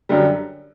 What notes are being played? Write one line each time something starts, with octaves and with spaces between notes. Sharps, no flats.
F#2 D3 G3